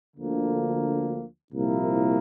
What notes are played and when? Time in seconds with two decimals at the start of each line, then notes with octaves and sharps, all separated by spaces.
0.16 D2 D3 F3 A#3
1.53 C2 A#2 F3 A#3 E4